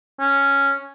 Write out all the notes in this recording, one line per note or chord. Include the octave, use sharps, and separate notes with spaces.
C#4